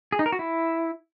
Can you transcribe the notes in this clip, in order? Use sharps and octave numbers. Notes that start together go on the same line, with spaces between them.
G#4
D#4
A#4
F#4
E4